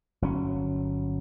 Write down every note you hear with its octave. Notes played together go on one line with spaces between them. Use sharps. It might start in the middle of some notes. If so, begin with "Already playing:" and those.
G1 F#3 C#4